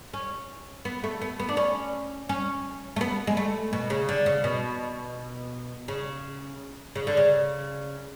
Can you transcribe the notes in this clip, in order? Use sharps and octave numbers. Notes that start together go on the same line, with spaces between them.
C#4
B3
A3
B3
B3
D4
C#4
C#4
A3
B3
G#3
A3
B2
C#3
D3
C#3
B2
C#3
C#3
D3
C#3